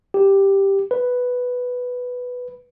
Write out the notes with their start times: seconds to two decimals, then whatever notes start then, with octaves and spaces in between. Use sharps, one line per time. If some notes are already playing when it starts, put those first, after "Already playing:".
0.14 G4
0.91 B4